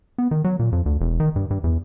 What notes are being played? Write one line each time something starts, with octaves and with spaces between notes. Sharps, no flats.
B3
D#3
F#3
A#2
F2
D2
E1
D#3
G2
G2
E2